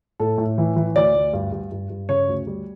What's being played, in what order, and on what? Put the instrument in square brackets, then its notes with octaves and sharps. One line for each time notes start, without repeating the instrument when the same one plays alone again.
[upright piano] A2 A4
A2
E3
E3
D2 D5
D2
G2
G2
G2
G2
C#3 C#5
D2
G3